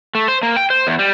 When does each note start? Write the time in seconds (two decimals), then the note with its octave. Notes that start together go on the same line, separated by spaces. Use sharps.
0.15 A3
0.28 C5
0.43 A#3
0.57 G5
0.70 C5
0.87 E2
0.99 G3